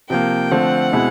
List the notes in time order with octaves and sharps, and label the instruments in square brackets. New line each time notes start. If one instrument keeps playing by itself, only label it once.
[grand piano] C3 F3 A#3 [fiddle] G5
[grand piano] D3 F3 A3 C4 [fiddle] F#5
[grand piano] B2 G#3 C4 E4